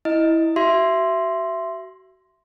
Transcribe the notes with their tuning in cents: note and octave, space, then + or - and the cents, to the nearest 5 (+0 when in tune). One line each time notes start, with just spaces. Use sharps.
E4 -10 D#5 +0
F#4 +35 E5 +20 C6 +0